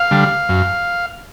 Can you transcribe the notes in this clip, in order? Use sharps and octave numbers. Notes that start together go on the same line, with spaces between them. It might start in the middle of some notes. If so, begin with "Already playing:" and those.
Already playing: F5
D3 G3
F#2